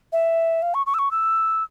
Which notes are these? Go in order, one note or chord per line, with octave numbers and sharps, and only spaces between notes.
E5
F5
C#6
C#6
E6
C#6
E6